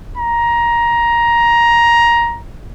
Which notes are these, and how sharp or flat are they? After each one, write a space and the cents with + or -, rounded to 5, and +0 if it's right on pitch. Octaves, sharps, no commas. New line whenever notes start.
A#5 +15